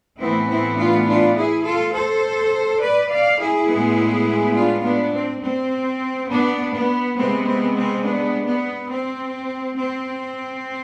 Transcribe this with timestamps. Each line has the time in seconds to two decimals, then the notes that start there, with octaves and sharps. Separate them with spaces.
0.19 A2 E3 B3 C4 E4
0.49 C4 E4
0.78 D4 F4
1.06 D4 F4
1.36 E4 G#4
1.65 F4 A4
1.94 A4 C5
2.82 B4 D5
3.10 D5 F5
3.39 E4 G#4
3.68 A2 G#3 B3
4.56 D4 F4
4.84 B3 D4
5.13 C4
5.42 C4
6.30 B3 D4
6.73 B3
7.16 C3 G#3 B3 C4
7.46 C4
7.75 C4
8.03 B3 D4
8.47 B3
8.90 C4
9.78 C4